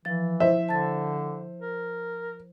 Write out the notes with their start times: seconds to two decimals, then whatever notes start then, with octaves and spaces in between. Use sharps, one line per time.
0.05 E3 F3 A6
0.40 E4 C5 E5
0.69 D3 A5 A6
1.61 A#4